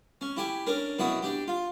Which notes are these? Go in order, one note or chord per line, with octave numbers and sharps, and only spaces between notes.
C#4
E4 G4 G#5
C#4 D4 A#4
F#2 B2 E4 F#4 D#6
D4 G4
F4